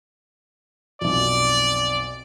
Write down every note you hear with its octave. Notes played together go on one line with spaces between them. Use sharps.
B1 F2 D5